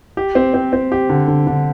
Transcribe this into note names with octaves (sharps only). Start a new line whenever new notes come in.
G4
C4
C4
C4
G4
D3
D3
D3